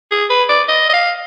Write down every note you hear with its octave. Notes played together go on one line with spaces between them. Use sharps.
G#4
B4
D5
D#5
D#5
F5